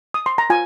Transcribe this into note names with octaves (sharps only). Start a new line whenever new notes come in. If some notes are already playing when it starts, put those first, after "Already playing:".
D#6
C6
A#5
F4 G#5